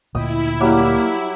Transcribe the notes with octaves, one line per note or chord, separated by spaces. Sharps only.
D2 A#2 E4 D#5 G5
F#3 G3 A#3 D6